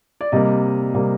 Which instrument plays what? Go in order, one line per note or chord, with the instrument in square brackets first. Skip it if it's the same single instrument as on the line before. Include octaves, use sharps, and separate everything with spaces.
[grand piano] D5
C3 G3 A#3 D#5
C3 G3 A#3